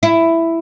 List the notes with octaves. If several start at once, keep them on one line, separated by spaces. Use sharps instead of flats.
E4